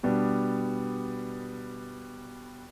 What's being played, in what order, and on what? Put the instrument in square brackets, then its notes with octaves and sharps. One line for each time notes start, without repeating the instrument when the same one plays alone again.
[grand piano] B2 G3 B3 D4